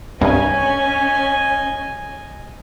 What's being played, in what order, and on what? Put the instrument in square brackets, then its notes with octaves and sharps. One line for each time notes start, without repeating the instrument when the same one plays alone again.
[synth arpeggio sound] C2 G2 [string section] C#4 [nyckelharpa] D#5 G#5